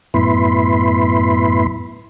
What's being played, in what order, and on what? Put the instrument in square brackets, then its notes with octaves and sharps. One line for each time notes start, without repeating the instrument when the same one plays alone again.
[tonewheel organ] F#2 A2 B3 E4 B5 C6